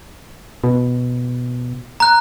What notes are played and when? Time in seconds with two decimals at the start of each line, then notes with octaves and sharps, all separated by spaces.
0.64 B2
2.00 A#5 F#6